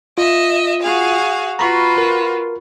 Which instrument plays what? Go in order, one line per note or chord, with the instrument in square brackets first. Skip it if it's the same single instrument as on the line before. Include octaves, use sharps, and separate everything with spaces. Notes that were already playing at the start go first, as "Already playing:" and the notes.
[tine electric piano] F4 [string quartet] D#5 E5
[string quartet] F#4 G#4 F5
[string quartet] F4 F#4 B4 [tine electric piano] A#5 B5 C#6
[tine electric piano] A#4